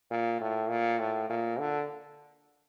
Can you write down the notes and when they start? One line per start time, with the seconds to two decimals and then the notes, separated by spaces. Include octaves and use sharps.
0.11 A#2
0.41 A2
0.69 A#2
0.99 A2
1.29 A#2
1.59 D3